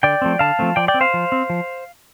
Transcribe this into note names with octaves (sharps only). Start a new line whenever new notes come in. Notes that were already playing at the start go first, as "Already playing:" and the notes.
D3 D5 G5
F3 A3 C4
D3 F5 A5
F3 A3 C4
F3 D5 G5
D5 G5
C4
C5 F5
F3
C4
F3